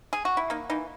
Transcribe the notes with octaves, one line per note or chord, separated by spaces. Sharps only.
G#4
F#4
E4
A#3 D#4
E3 D#4